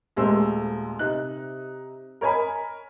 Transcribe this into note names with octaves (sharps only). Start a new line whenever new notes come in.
D#1 G#3 A3 C5 E6
C3 D#4 F#6
A#4 C#5 D#5 G#5 B5